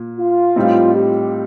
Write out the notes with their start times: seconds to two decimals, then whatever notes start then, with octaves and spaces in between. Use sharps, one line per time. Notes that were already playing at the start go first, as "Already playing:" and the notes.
Already playing: A#2
0.18 F4
0.56 A2 G3 C4 D#4
0.94 G4